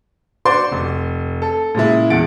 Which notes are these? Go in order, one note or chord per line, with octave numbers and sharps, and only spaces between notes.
F#4 C5 D5 C6 D6
F1
A4
A#2 C#3 G#3 E4
E1 E2 F#5 A6 D7